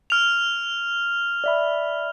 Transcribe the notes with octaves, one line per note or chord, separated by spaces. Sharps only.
F6 F7
D5 E5 B5